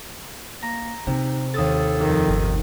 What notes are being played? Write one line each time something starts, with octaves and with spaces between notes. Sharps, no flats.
A#3 A#5
C3 C4 D#4
D#2 A4 D#6 A6
F2 D#3
G1